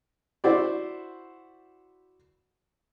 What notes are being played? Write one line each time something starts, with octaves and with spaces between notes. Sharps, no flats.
E4 F#4 C5 D5